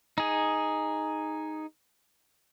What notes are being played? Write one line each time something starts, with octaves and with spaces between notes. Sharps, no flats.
D#4 G#4